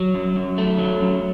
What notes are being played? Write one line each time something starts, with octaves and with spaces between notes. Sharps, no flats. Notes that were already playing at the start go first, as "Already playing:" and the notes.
Already playing: F#3
F#2
F#2
A3
F#3
F#2